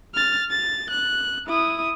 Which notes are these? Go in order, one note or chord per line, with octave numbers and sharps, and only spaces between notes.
F6 A6
A6
F#6
E4 D#6